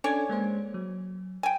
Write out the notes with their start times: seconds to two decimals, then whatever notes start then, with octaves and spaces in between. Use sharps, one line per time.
0.04 C#4 D4 A4 C#5 D5 G#5
0.29 G#3 A#3 C5
0.74 F#3
1.43 G5 G#5